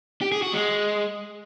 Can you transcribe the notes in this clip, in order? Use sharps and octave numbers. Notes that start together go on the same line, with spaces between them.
G4
G#4
F#4
G#3